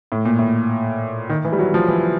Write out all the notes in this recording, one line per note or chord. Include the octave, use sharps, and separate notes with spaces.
A2
A#2
A2
D#3
E3
G3
F#3
F3
E3